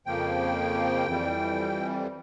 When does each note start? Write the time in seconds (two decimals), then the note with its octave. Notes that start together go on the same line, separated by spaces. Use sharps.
0.06 F2 C#3 F3 A#3 G5
1.07 F2 E3 G3